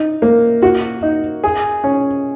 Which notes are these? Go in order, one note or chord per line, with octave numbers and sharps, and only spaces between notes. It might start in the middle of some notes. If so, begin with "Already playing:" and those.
Already playing: D#4
A#3
F#4
D#4
G#4
C#4